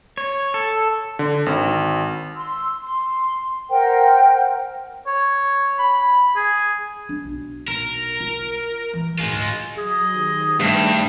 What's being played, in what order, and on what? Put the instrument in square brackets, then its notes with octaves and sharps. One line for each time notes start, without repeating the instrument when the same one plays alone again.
[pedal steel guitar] C#5
A4
[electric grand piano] D3
G#1
[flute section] C6 E6
C6
A#4 C5 F#5 G5
[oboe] C#5
B5
G#4
[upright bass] D4
B1
[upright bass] B1 [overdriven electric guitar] A#4
[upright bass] F4
E3
[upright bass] D2 G#2 [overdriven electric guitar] G#3 F4
[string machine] F#3 B5 A#6 [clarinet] G#4 [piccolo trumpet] D#5
[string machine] D#3 G4 C5
[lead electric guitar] G2 [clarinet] A3